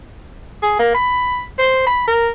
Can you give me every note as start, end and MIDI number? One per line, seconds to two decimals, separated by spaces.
0.62 0.75 68
0.79 0.93 58
0.94 1.43 83
1.59 1.83 72
1.86 2.04 83
2.07 2.29 70